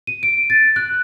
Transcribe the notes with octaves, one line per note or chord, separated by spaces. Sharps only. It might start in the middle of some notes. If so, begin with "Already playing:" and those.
D#7
D7
A6
F#6